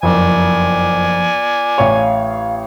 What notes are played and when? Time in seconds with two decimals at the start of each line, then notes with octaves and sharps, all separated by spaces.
0.03 F#1 F2 F3 D5 G#5
1.78 A1 C#5 F5